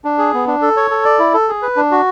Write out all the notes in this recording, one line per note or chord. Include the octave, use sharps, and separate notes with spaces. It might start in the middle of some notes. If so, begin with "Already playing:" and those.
D4
G#4
B3
D4
A4
C#5
A4
D5
E4
A4
G#4
B4
D4
F#4